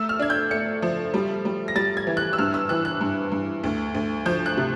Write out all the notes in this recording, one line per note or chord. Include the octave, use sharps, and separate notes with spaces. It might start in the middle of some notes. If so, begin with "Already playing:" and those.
Already playing: A3 E6
F6
D4 G#6
G6
A3 C#7
F3
G3
G3
A#6
G3 A6
G#6
E3
F#6
E6
G2 F6
E6
E3 F#6
F#6
G2
G2
D2
D2
F3 G6
F#6
C3